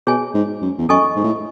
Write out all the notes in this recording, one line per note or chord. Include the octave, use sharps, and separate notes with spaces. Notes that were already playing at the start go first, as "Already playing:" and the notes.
B2 G#4 C#5 G#5
G#2
F#2
E2
F#2 A4 D#5 G#5 C#6
G#2
A2